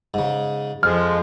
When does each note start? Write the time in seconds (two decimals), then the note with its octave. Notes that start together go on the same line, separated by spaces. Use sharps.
0.14 G#2 C#3
0.83 F2 F3 G#3 F6